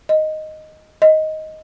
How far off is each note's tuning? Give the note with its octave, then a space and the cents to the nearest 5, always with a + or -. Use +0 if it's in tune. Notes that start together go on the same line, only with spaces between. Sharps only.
D#5 +0
D#5 +10